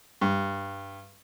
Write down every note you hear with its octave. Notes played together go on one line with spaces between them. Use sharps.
G2